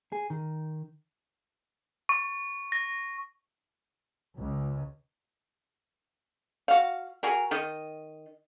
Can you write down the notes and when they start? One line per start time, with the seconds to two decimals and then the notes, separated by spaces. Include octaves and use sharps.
0.12 G#4
0.30 D#3
2.09 C#6
2.72 A#6
4.37 C#2
6.68 F#4 F5
7.23 F#4 G#4 A#4
7.51 D#3 D#5